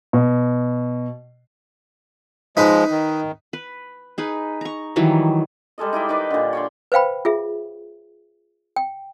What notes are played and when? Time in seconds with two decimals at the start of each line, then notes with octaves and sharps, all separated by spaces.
0.13 B2
2.57 F3 G#3 D#4 B4
2.90 D#3
3.53 B4
4.18 D#4 G#4 B4
4.61 A#5 C#6
4.96 D#3 E3 F#3 G3
5.78 G3 G#3 A4 D#5
5.93 D#4 E4 D5 G5
6.09 D#3 D#4 B4 D5
6.31 A#2 D3
6.53 C#5 D5 C6
6.92 B4 C5 F5 G5 B5
7.25 F4 G#4 E5
8.76 G5